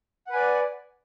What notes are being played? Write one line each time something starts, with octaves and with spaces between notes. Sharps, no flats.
B4 D5 F#5 G#5